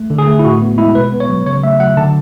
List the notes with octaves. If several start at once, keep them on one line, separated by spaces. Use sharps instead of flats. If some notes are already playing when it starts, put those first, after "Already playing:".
Already playing: A3
D3
G#4
A3
E4
A2 F#4
B3
G#3 E4
B2 B4
B3
C#5
F#3
C#3 C#5
A3 E5
F#3 F#5
D3 A5